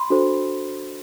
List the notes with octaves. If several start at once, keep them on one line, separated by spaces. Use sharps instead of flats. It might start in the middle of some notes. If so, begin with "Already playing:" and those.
Already playing: B5 C6
D4 F#4 A4 C5